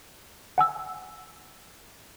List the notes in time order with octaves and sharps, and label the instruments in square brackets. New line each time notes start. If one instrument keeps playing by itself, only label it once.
[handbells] F#5 G#5 E6